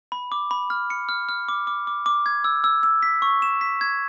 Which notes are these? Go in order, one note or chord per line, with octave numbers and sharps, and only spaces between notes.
B5
D6
B5
F6
C#7
F6
F6
D6
D6
D6
D6
G#6
E6
E6
E6
B6
C#6
E7
B6
G#6